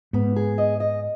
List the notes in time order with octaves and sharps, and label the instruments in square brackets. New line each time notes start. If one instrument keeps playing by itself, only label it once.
[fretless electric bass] G#2 [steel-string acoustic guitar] B3
[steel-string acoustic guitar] G#4
D#5
D#5